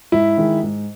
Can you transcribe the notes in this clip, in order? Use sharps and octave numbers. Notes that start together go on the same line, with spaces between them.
G#2 E4
D#3 G#3
G#2